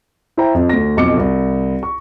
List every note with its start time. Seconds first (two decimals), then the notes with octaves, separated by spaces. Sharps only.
0.37 E4 C5 E5 G5 A#5
0.54 F2
0.69 D2 A#6
0.97 B1 F2 D6 C#7
1.17 C2
1.83 C#6